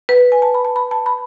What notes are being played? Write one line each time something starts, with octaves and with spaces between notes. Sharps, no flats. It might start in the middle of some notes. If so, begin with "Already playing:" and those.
B4
G#5
A5
B5
A5
B5
A5
B5